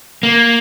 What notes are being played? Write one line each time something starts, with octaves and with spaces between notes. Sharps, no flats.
A#3